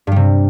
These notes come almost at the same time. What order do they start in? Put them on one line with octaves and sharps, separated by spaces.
G2 G3 C3